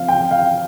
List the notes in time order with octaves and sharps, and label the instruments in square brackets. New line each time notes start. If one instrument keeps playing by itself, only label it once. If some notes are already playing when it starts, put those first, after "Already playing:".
Already playing: [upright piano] F3 C4 F5
G5
F5